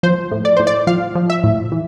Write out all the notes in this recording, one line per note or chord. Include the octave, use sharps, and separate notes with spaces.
F3 C5
A2
D5
A2 C5
D5
F3 F5
F3
E5
A2
E3